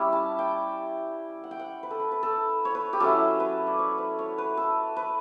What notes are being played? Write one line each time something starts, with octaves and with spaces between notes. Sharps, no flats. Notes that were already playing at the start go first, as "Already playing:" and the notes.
Already playing: G3 C#4 E4
A5
G5
F#5
G5
F#5
B4
A4
B4
B4
A4
C#5
B4
G4
F#3 C#4 E4 A4
B4
D5
C#5
B4
C#5
B4
A4
B4